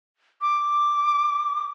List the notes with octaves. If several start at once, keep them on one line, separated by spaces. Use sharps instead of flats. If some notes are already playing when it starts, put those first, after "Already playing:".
D6